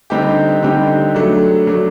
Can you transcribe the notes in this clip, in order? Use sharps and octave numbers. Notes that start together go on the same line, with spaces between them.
D3 G3 C4 D#4 G4
D3 G3 C4 D#4 G4
F#3 A3 D4
F#3 A3 D4